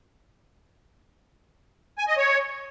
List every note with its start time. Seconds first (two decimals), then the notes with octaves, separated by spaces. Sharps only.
1.98 G#5
2.08 D#5
2.17 C#5